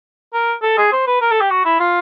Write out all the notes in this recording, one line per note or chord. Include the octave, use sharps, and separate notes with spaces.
A#4
A4
G#4
C5
B4
A#4
A4
G4
F#4
E4
F4